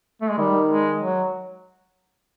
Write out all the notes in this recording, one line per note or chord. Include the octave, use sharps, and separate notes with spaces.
A3
G#3
D#3 G3
G#3
F#3